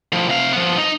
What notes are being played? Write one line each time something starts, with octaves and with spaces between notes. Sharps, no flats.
A2 F3
C3 F5
F3 B3
D#4